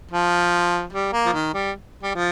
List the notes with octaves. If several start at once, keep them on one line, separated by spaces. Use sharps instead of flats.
F3
G3
A#3
F3
D#3
G3
G3
F3